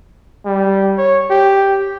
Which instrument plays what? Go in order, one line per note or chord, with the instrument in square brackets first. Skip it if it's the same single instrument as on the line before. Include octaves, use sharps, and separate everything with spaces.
[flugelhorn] G3
C#5
G4